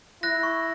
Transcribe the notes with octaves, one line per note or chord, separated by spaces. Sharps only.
E4 F#6 A#6
C#6